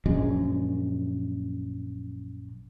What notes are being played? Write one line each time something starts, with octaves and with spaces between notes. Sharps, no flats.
A#1 F#2 G#3